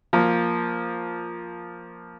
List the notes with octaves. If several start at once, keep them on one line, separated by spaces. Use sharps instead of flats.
F3 A#3